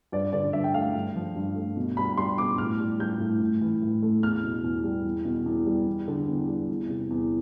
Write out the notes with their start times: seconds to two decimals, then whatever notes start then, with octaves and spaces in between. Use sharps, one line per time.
0.12 G2 D5
0.33 D3 D5
0.53 G2 E5
0.64 G5
0.74 A3 F5
0.94 G2
1.16 F3
1.36 G2
1.55 A3
1.76 B2
1.97 G3 B5
2.17 G3 C6
2.38 B2 D6
2.58 A2 F6
2.80 G3
2.99 G3 G6
3.19 A2
3.40 A2
3.61 E3
3.82 A2
4.03 A3
4.22 E2 F6
4.43 B2
4.64 E2
4.84 G3
5.04 E2
5.25 B2
5.46 E2
5.66 G3
5.87 E2
6.08 D3
6.28 E2
6.48 G3
6.69 E2
6.89 C3
7.10 E2